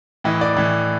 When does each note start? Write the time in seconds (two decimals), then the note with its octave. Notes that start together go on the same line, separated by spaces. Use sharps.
0.24 A2 E3 D#5
0.41 D5
0.57 A2 E3